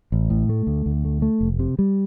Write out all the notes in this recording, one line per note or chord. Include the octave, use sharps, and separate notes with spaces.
A1
A2
A3
D2
D2
A3
A3
F1
C3
G3